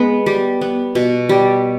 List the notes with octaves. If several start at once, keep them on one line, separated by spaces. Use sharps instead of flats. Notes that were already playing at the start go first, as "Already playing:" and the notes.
Already playing: G#3 B3
G3
B3
B2
G3